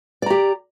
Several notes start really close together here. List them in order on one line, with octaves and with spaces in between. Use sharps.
D5 A#5 G4